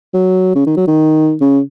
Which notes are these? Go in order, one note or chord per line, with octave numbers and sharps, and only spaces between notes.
F#3
C#3
D#3
F#3
D#3
C#3